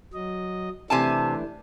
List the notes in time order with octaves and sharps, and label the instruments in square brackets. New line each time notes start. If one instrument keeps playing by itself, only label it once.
[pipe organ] F#3 D#5
[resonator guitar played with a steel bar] C3 G#5 A5 [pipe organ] E3 A3 D4